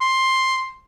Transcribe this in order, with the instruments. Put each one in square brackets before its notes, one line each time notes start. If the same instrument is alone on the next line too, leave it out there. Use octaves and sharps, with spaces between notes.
[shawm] C6